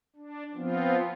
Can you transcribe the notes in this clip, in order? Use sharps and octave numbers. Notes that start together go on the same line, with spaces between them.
D4
F3 B3 C4 F4